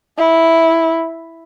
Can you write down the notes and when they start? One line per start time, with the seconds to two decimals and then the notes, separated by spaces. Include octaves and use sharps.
0.18 E4